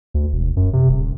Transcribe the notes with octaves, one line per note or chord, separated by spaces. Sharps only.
D2
E1
F#2
C3
D#1